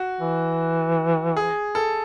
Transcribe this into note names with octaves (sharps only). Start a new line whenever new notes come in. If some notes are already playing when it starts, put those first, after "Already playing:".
Already playing: F#4
E3
G#4
A4